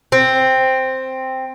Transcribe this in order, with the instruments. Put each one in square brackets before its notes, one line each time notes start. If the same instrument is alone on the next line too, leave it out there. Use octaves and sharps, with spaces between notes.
[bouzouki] C4